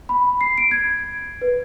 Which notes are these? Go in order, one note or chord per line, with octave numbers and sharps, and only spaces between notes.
B5
C7
D7
G#6
B4